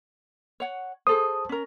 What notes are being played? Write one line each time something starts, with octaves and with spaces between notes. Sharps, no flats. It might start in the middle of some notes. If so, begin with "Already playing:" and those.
C#5 F#5
G#4 A4 C5 D#6
C#4 A#4